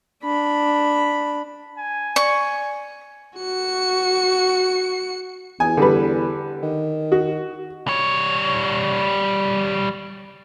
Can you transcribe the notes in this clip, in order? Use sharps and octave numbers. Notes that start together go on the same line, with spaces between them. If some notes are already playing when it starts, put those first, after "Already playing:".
D4 B5
G#5
D5 C#6
F#4 C#7
E2 G#5
D3 G3 B4
D#3
F#4
G3 C#5